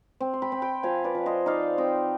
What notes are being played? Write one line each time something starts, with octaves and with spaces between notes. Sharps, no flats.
C4
C6
G5 B5
C4
G5 B5
F3 F5 G#5
B4 D5
F3
C5 D#5
D#4 D5 F5
C4 D#5 G5